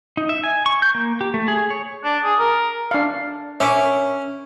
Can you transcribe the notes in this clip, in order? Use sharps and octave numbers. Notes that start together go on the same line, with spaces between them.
D#4
E5
G#5
C#6
G6
A#3
G4
A3
G#4
C#5
D4
G#4
A#4
D4 F5
C#4 A#4 C#5 E5 C#6 D6